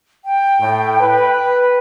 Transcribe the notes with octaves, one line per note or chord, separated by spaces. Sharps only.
G5
A2
B4